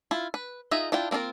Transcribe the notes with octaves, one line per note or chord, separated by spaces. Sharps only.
E4 F4
B4
D#4 F4 G#4 D#5 E5
D4 E4 F4 G5
A#3 C4 D4 F4 A#4